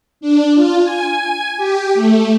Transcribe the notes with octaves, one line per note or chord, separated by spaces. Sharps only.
D4
F4
G#5
G4
A3